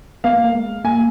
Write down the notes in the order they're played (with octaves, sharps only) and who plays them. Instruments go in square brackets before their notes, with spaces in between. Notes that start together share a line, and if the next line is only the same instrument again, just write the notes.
[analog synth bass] B3 [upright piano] F5
[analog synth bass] A#3
A#3
G#3
[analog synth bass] A#3 [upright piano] G#5